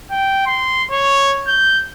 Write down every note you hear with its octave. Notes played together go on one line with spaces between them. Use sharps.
G5
C6
C#5
G6